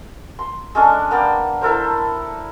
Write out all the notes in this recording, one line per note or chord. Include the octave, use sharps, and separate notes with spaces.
C6
G#3 C#4 D4 A4
A#3 B3 D5 G5
E4 A4 A#4 C5